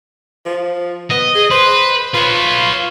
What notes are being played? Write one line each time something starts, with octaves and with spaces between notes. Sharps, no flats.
F3
B3 D#5
G#4
B4 C5
F4 B4 C#5